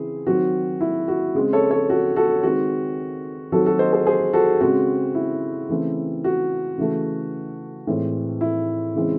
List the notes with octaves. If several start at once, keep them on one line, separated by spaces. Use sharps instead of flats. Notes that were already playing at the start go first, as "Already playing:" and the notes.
Already playing: C#3 E3 C4 E4 G#4
D#3 F#3 C4 F#4
E4
F#4
C#3 G#3 C4
A4 C#5
A4 C#5
F#4 A4
F#4 A4
D#3 G#3 C4 F#4
D#3 F#3 C4 F#4 A4
F#4 A4
C5 D#5
G#4 C5
G#4 C5
F#4 A4
C#3 G#3 C4 F#4
E4
C#3 E3 A3 C4
F#4
C#3 E3 A3
A2 E3 G#3 C4
E4
C#3 E3 G#3 C4